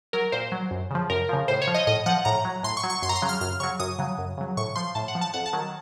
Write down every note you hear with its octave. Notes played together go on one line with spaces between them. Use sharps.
F#3 A#4
A#2 C5
F#3
F#2
C#3 F3
F#2 A#4
C#3 F3
A2 C5
C#5
F3
D#5
A2 D#5
F3 F#5
A2 A#5
F#3
A2 C6
C#6
F#3
C#6
F#2 C6
A#5
C6
C#3 F#3
F6
F#2 F6
C#3 F#3 C#6
F#2 D#6
C#3 F#3
F#2
C#3 F#3
A2 C#6
F3 C6
A2 A5
F#5
F3
A5
F2 F#5
A5
D#3 F#3